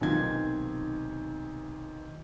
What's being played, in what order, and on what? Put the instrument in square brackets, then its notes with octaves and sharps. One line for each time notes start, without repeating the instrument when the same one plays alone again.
[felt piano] B1 C3 D#3 F4 G#6